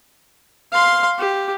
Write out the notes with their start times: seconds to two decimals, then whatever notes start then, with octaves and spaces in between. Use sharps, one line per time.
0.73 F5 C6
1.19 G4